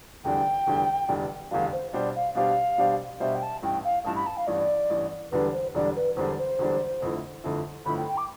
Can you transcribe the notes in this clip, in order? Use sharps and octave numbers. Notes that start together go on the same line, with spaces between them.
F1 E2 D3 G3 D4 G5
F1 E2 D3 G3 D4
F1 E2 D3 G3 D4
F1 E2 D3 G3 D4 F5
C5
B2 G3 D4 G4 C5 D5
F5
B2 G3 D4 G4 C5 F5
B2 G3 D4 G4 C5
B2 G3 D4 G4 C5 E5
G5
A5
A1 G2 E3 G5
F5
A1 G2 E3 A5
B5
A5
F5
A1 G2 E3 D5
A1 G2 E3
E1 E2 D3 G3 D4 B4
C5
E1 E2 D3 G3 D4 D5
B4
E1 E2 D3 G3 D4 C5
C5
E1 E2 D3 G3 D4
G1 F2 D3 A3 E4
G1 F2 D3 A3 E4
G1 F2 D3 A3 E4 B5
G5
G5
D6